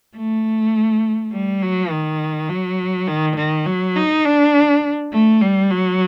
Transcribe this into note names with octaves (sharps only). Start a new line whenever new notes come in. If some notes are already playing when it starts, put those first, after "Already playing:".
A3
G3
F#3
D#3
F#3
D#3
D#3
F#3
D#4
D4
A3
G3
F#3